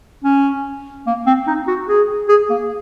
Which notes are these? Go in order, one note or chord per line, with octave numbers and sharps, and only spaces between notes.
C#4
A#3
C4
D#4
F#4
G#4
G#4
A#3